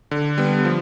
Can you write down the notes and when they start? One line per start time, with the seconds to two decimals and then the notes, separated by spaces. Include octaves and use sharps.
0.11 D3
0.38 G3 B3
0.65 F3